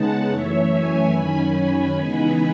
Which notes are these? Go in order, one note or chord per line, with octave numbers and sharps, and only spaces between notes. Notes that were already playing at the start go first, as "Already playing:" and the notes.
Already playing: C#3 G#3 B3 D#4 F#5 A5
F#2 E3 A3 C#5 E5
E5 G#5
F#2 D#3 F#3 C#4 G#5 B5
C#3 E3 G#3 B3 D#4 G#5 B5